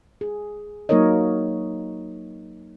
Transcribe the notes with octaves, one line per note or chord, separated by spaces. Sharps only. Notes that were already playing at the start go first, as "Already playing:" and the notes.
G#4
F#3 A#3 D#4 A#4 C#5 D#5